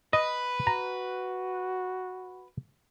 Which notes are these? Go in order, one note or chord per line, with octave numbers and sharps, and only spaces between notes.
B4 D#5
F#4 A#5